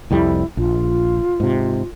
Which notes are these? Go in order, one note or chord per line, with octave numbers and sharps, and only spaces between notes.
C2 F2 G3 E4
A#1 F4
G#2 C3